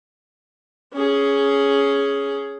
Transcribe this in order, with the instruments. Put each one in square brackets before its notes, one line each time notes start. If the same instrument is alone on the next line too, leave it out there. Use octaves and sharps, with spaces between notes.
[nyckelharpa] C#4 G#4